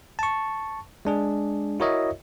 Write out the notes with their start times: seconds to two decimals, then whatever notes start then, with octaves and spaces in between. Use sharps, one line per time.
0.19 A5 C#6
1.05 G#3 D4 G#4
1.80 E4 F#4 A#4 C#5 D#5 E5